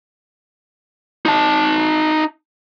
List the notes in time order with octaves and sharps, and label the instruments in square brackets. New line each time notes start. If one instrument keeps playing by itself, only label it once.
[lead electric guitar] D#4 A5